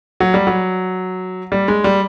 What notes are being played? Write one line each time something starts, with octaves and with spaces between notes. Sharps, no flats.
F#3
G3
F#3
G3
G#3
G3